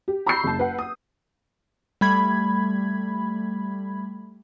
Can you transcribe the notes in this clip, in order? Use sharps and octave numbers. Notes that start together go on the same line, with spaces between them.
G4
A#5 B5 C#6 E6 G6 C7
F#1 A5
B4 F#5
D#6
G3 A3 B5 G#6